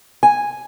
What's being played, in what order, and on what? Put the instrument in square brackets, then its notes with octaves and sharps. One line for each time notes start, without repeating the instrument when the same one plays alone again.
[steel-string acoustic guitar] G#5